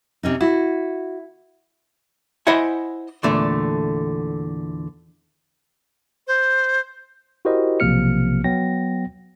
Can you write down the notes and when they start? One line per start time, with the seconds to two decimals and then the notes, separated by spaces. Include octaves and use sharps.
0.23 C3 C#4 D#4
0.41 E4 F#4
2.47 E4 C5 D#5 E5 F#5 G#5
3.23 E2 A#2 D3 A3
6.27 C5
7.45 E4 F#4 G4 A#4 C5 D#5
7.80 B1 C3 F3 A#3 F6 C#7
8.44 F#3 B3 G5 A#6